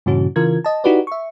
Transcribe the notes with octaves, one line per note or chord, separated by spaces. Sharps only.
G2 A#2 C#3 E3 C#4 F#4
C#3 E3 F4 A#4 G#6
D#5 A5
D#4 E4 F#4 G4 B4 D5
E5 C#6